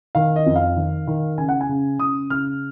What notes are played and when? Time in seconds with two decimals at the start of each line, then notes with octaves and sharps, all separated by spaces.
0.15 D#3 F5
0.36 D#5
0.46 F2
0.56 F5
0.76 D#3
1.07 D#3
1.38 C#3 G#5
1.49 F#5
1.61 G#5
1.69 C#3
1.99 C#3 D#6
2.30 C#3 F6